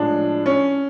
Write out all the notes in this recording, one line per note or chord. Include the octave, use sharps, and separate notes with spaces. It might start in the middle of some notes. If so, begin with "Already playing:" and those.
Already playing: A2 F3 G#3 D4
C#4